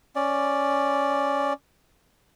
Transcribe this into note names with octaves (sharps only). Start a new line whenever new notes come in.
C#4 D5